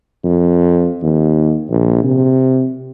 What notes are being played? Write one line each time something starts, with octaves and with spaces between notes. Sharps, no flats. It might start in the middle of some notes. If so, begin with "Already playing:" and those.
F2
D#2
A#1
C3